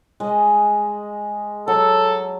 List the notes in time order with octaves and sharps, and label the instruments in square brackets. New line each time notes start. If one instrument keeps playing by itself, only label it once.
[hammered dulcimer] G#3 D#5
[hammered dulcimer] F#3 [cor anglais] A4